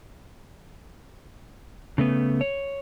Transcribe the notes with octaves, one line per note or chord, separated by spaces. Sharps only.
C#3 A3 B3
C#5